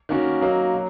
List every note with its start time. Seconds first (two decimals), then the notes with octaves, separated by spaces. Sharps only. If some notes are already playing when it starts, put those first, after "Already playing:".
0.09 D#3 A#3 C#4 F#4
0.41 F#3 A#3 D#4 F#4
0.74 F#3